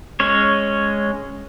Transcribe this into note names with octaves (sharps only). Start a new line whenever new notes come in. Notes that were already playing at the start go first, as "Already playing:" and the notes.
G#3 C#4 C#5